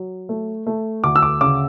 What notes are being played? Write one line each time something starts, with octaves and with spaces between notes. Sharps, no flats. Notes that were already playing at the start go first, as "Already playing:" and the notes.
Already playing: F#3
A3
A3
D2 D6
E6
D6
C#3 D6